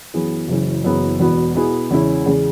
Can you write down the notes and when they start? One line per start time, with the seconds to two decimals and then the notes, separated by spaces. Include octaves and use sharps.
0.14 F#2 E3 B3 G#4
0.48 F#1 F#2 C#3 E3
0.84 F#1 F#2 E3 B3 G#4
1.19 E1 E2 B2 B3 F#4
1.55 B2 B3 E4 G#4
1.91 E2 C#3 G#3 C#4 E4
2.26 E2 C#3 G#3